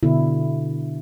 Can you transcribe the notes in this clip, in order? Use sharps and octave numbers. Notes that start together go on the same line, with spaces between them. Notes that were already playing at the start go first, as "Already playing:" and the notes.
B2 D3 E4